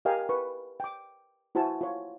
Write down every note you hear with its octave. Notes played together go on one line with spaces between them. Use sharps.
G4 A#4 D#5 F5 G5 G#5
B4 C#6
G5 D6
E4 F#4 C5 G#5 A5
F4 C#5